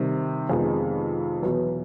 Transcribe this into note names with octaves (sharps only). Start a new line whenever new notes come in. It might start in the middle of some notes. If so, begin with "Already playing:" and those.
Already playing: C3 D#3 G3
F2 C3 D#3 G#3 B3
E2 B2 F#3 B3